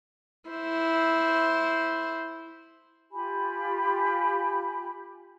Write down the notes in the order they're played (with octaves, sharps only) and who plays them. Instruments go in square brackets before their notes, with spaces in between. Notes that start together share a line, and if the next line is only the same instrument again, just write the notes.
[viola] E4 C5
[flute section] F4 G4 G#5 B5